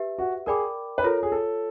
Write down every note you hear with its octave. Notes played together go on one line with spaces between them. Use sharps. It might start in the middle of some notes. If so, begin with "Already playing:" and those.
Already playing: G4 B4 E5
F#4
G#4 A#4 D5 G5 B5 D6
B4
F4 A4 A#4 C#5
G#4
A4